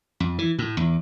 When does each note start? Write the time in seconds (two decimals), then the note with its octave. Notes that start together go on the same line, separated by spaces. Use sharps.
0.20 F2
0.39 E3
0.59 A2
0.77 E2